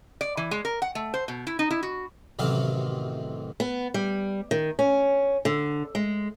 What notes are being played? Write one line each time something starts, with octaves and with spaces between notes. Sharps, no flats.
D5
E3
G#3
A#4
F#5
A3
C5
B2
E4
D#4
E4
F#4
A1 C3 D#3 F#3 F5
B3
G3
D#3
C#4
D3
G#3